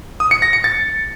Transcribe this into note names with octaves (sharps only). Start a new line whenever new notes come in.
D#6
C#7
A#6
C#7
A6